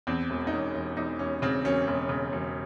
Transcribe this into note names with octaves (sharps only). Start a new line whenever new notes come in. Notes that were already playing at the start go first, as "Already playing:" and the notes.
E2 C4
E1
D#4
E1 C#4
E1
E2 D#4
E1 C#4
C#3 C4
E1 C#4
E1
C#3
E1